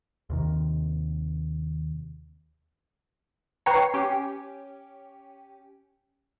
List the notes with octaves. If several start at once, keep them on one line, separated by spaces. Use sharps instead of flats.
D#2 C3 D#3
B4 C#5 G5 A#5 C7
C#4 G4